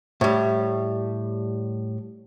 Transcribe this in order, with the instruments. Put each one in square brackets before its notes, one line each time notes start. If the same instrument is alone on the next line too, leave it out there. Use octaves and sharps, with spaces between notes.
[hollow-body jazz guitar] A2 G3